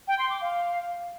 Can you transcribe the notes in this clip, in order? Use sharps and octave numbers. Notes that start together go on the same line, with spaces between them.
G5
C6
D6
F5